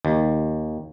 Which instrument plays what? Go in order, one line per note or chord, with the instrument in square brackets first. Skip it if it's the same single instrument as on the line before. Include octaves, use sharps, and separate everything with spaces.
[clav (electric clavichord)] D#2